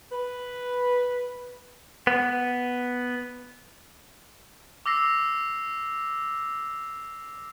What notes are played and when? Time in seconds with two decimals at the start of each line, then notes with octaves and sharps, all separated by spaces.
0.12 B4
2.07 B3
4.86 D6 E6 A#6 C7